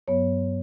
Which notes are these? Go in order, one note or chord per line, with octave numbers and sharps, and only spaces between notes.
G2 F#3 B3 C#5